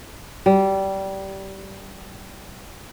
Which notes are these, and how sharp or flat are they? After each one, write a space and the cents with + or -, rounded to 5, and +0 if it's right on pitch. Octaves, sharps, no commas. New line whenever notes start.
G3 -20